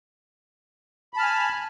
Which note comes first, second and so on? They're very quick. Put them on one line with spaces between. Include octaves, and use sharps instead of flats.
B5 A5 F6 G#5